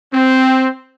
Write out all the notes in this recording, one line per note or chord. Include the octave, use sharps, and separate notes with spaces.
C4